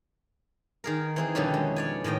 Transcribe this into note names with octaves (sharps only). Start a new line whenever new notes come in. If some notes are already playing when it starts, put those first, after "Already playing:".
D#3 G#4 A#4
E3 C4 G#4
F2 B2 D3 D#3 G3 C#4
G#3
C#5 D5 G#5
A2 D#3 D#5 G5